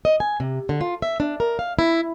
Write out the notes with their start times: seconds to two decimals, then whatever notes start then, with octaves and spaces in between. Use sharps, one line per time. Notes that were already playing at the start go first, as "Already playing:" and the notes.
0.05 D#5
0.20 G#5
0.40 C3
0.69 D3
0.81 F4
1.02 E5
1.20 D4
1.40 A#4
1.59 F5
1.79 E4